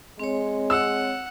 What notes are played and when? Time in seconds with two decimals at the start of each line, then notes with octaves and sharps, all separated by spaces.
0.19 G#3 C4 C#5
0.70 F#5 E6